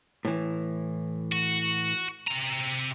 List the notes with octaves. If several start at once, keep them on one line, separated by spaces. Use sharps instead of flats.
A2 E3
F#4
C3 A#5